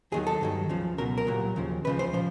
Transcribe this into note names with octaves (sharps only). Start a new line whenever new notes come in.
D#2 D#3 F#3 G#4
A4
G2 D#3 F#3
C#2 C#3 F3
C#2 B2 F#3 A#4
A#4
C2 A#2 F#3
D#2 C#3 F3
C#2 C#3 F3 B4
C5
A#2 F3 C5